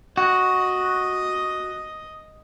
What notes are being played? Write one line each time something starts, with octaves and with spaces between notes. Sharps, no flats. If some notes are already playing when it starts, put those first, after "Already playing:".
F#4 D#5